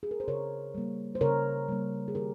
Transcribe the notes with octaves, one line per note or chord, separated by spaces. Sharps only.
G#4
A#4
C5
C#3 A#4 C#5
G3 A#3
C5
C#3 A#4 C#5
G3 A#3
G#4
D#3 G4 A#4